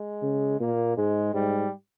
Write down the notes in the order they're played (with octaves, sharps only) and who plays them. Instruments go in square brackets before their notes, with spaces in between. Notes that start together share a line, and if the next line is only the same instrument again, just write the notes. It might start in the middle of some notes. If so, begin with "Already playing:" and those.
Already playing: [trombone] G#3
[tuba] C#3
[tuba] A#2 [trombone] A#3
[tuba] G#2 [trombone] G#3
[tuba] G#2 [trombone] G3